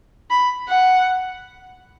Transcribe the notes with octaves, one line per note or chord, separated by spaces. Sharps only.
B5
F#5